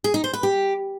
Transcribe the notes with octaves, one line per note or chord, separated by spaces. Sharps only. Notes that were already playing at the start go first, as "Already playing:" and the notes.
G#4
D#4
C5
B4
G4